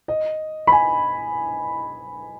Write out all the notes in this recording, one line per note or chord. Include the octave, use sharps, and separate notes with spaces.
D#5
B5
G#5